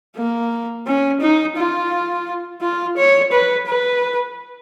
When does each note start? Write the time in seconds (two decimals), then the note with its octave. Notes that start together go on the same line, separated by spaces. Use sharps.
0.17 A#3
0.87 C#4
1.21 D#4
1.57 F4
2.62 F4
2.98 C#5
3.32 B4
3.67 B4